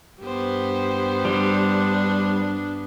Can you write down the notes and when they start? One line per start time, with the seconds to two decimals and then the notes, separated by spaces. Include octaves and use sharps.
0.21 G2 B3 G4 C5
1.25 G3 D4